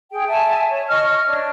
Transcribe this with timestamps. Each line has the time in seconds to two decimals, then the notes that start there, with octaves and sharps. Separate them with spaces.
0.11 G#4 G5
0.27 E5 G#5 A5
0.68 C#5
0.88 D#5 C#6 F6
1.26 D4 C#5